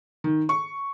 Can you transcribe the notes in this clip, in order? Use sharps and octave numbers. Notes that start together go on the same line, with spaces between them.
D#3
C#6